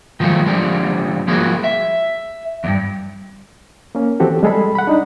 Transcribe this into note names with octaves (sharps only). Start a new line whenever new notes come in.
D#3 F3 F#3 G#3 A3
D3 F3 G3 G#3
F3 G#3 A#3 F#4 G#4
E5
E2 G2
A#3 C#4
E3 C4 F#4 G4 A4
G3 G#3 G#4 A4 B5
F#5 B5
D4 D#4